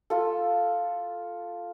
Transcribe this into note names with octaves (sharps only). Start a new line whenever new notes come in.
F4 A4